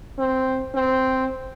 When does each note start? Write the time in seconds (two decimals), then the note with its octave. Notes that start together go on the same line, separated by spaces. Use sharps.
0.19 C4
0.75 C4